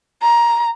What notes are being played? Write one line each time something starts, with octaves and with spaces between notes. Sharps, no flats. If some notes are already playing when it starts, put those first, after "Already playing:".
A#5